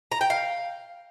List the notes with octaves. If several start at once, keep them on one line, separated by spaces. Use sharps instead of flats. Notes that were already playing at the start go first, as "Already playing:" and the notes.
A#5
G5
F5